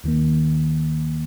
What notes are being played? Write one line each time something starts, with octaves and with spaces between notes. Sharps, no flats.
D#2 D#3 A#3